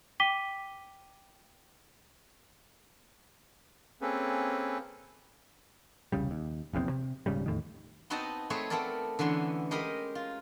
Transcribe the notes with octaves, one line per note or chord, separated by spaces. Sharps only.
G5 D6 B6 D#7 G7
A#3 C4 C#4 G#4 A4 B4
E1 C2 C#3 G3
D#2
F1 A#1 E2 C4
C3
D#1 G#2 C#3 G3
E2 A2 D#3
B3 C4 D#4 F#4 D#5 A5
A3 C4 G#4 B4 C#5
A3 B3 C4 A4 A#4 D5
D3 E3 B3 C#4 C6
G#3 G4 A#4 D#5 B5
F4